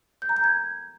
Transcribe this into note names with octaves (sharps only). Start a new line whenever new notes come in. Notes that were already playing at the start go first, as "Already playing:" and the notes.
G6
A#5
G6
G#6